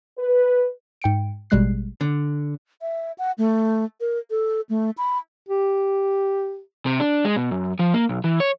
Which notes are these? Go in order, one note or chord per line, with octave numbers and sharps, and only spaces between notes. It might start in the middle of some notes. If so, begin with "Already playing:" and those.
B4
G#2 G5 C#7 D7
A1 B2 G3 G#3 F#6 C7
D3
E5
F#5
A3
A#4
A4
A3
B5
G4
C3
D4
G#3
B2
F#2
F3
A#3
B1
E3
C#5